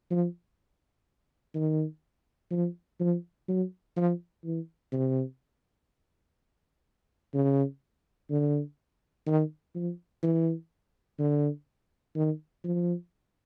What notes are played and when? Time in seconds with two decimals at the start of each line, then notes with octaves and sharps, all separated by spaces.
0.10 F3
1.55 D#3
2.51 F3
3.00 F3
3.48 F#3
3.96 F3
4.44 E3
4.92 C3
7.34 C#3
8.30 D3
9.27 D#3
9.75 F3
10.23 E3
11.19 D3
12.16 D#3
12.64 F3